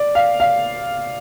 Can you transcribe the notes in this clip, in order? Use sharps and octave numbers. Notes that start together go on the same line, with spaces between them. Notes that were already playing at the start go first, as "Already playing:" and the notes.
Already playing: D5
F5
F5